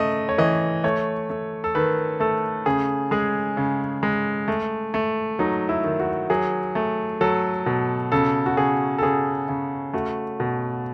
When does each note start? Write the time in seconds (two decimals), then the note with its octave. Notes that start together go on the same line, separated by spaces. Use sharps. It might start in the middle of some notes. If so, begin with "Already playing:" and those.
Already playing: C#3 A3 D#5
0.29 C#5
0.38 E3 D#5
0.84 A3 C#5
1.30 A3
1.64 A4
1.75 D#3 B4
2.20 A3 A4
2.66 C#3 G#4
3.11 G#3 G#4
3.57 C#3
4.03 G#3
4.48 A3
4.94 A3
5.39 F#3 D#4
5.69 E4
5.84 D#3
6.00 F#4
6.30 F#3 G#4
6.75 A3
7.21 F#3 A4
7.66 B2
8.12 C#3 A4
8.46 F#4
8.57 C#3 G#4
8.98 A4
9.03 C#3 G#4
9.49 C#3
9.93 A3 F#4
10.40 B2